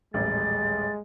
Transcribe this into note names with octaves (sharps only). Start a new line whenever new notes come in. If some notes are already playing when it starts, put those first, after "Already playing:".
D#1 A1 G#3 A6